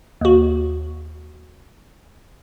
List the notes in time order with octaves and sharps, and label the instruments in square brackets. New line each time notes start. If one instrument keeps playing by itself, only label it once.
[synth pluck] D#2 F#4